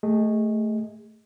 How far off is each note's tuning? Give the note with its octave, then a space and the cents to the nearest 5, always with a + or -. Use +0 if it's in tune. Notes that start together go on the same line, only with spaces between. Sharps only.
A3 +0 G#4 -35 D#5 +10